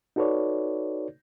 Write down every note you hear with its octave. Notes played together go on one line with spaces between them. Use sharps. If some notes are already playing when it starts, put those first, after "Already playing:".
D#4 F#4 A4 B4 C#5 D5